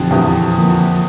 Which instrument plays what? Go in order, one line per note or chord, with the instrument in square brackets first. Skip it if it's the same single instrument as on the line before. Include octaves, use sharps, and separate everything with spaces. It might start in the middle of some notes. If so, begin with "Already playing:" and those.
Already playing: [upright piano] F2 D3 [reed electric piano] A#2 F3 C4 G4
[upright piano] E2 [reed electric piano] A#2 F3 C4 G4
[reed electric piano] D3 F3 A#3 F4